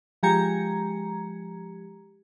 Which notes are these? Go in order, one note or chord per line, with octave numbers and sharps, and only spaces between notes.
F3 G#3 G4 A#5 G#6 C#7